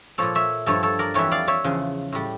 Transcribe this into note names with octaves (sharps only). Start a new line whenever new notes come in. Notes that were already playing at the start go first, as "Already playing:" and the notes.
A#2 F3 A4 C#5
C#5 E5
G2 F3 A4 C#5
A4 C#5
A#4 D5
F2 E3 G3 C#5 E5
D5 F5
C#5 E5
E2 C#3 F3
A2 G3